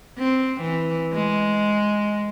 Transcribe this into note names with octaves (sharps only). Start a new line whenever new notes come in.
C4
E3
G#3